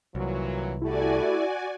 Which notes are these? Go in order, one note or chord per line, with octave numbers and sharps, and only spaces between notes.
C2 A#2 E3 F#3
A3 E4 F#4 G4 A4 D5 G#5